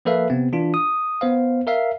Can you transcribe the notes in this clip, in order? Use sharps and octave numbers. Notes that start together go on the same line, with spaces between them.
F3 A#3 A4 B4 E5 F5
C3 B3 C4
E3 D4 F4
D#6
B3 C5 F5
A#4 E5 F5